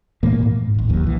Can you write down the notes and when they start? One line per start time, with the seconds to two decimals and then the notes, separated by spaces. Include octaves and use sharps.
0.23 A#2 E3 A3 A#3
0.43 G#2
0.74 E1 A1
0.88 D1 D#2 F#3
1.04 B1 E3